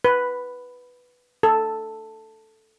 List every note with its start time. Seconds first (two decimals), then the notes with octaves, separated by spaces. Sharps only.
0.05 B4
1.43 A4